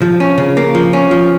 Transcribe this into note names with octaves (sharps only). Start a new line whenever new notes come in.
F3
C#4
C#3
A#3
F3
C#4
F3